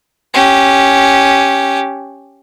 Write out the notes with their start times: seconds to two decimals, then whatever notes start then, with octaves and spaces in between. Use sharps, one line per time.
0.34 C#4 G4